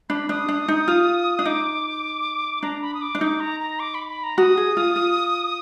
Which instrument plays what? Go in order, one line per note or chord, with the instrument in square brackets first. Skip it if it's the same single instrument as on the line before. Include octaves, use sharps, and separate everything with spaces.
[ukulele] D4 [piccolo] B5
[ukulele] D4 [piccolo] D#6
[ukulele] D4
D#4
F4
D4
[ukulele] D#4 [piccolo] D6
[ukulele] D4 [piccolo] A#5
[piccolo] B5
D#6
D6
[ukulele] D4
[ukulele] D#4 [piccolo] D6
[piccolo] A#5
A#5
D6
B5
B5
A#5
[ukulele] F#4 [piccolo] D#6
[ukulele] G#4
F4
F4